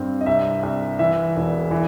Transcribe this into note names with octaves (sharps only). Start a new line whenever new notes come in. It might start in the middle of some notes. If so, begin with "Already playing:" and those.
Already playing: G2 C4
D#5
C2 E5
C2
E3 E5
E1
E3